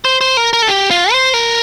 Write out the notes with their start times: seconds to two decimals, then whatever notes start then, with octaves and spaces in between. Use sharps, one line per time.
0.05 C5
0.21 C5
0.37 A#4
0.53 A#4
0.62 A4
0.68 G4
0.91 F4
1.12 C5
1.34 A#4